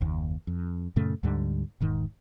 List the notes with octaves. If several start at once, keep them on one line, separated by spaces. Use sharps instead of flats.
F#1 D#2
F2
F#2 A#2 C#3 A3
D2 G#2 D3 G3
E1 G#2 D#3